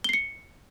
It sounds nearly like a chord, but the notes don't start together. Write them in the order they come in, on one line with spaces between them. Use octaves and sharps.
G7 C7 C#7